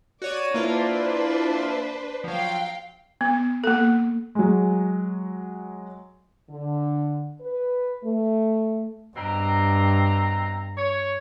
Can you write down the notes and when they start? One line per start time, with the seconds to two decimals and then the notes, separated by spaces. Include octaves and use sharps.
0.22 F#4 C#5 D5 D#7
0.54 A#3 D4 E4 F4 B4 C5
2.24 F3 F#3 F5 G5
3.21 B3
3.64 A#3 A4
4.35 F#3 G#3
6.50 D3
7.41 B4
8.03 A3
9.17 G2 B2 C4 A#5
10.77 C#5